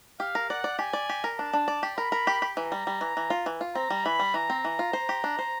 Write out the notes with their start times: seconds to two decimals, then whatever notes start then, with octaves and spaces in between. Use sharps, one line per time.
0.20 G4 F5
0.35 A#4
0.50 D5 F#5
0.64 D5
0.79 G4 G#5
0.93 D5
1.09 G4
1.24 A#4
1.38 D4 A5
1.53 D4
1.68 D5
1.83 G4
1.97 A#4 B5
2.12 A#4
2.27 G4
2.42 G4
2.57 E3 A#5
2.72 G3
2.87 G3
3.01 E3
3.17 E3
3.30 F4
3.46 E3
3.61 F4
3.75 C4 A#5
3.90 G3
4.05 E3 B5
4.19 G3
4.34 E3 A#5
4.50 C4
4.65 E3
4.79 F4
4.93 C5
5.09 G4
5.24 D4
5.39 C5